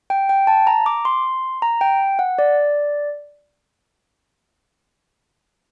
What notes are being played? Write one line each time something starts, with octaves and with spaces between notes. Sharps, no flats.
G5
G5
A5
A#5
D6
C6
A#5
G5
F#5
D5